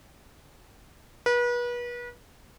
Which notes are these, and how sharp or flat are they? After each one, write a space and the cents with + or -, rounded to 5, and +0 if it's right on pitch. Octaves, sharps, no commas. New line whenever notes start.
B4 -35